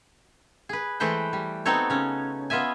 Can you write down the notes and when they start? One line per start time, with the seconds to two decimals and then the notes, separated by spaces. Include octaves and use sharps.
0.69 G#4 B4
1.00 E3 G#3 A3 B4 C5 G5
1.33 G3
1.66 B3 C4 D#4 F#4 A4 C#5
1.90 C#3 C#4
2.50 B3 F4 D#5 E5 G#5